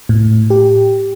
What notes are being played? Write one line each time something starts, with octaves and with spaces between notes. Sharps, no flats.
A2
G4